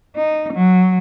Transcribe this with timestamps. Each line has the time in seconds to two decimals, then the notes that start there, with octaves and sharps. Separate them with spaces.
0.15 D#4
0.53 F#3